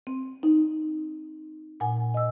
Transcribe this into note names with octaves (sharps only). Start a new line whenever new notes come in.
C4
D#4
A#2 F#5 G#5
D#5 E6